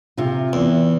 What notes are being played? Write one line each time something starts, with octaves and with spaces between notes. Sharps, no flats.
C3 F4
E2